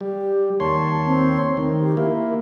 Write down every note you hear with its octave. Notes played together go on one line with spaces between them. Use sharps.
G3 G4
D#2 C#5 A5 C6
C4
D#3 A3
G4
A#3 E4 A#4